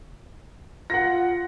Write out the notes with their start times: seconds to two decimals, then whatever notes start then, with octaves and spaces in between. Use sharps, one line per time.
0.90 F4 F#5 A#6